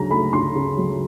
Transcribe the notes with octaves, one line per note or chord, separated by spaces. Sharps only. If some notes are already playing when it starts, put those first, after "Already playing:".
Already playing: D2 C#3 F#3 A#5
A3 B5
D2 C6
C#3
F#3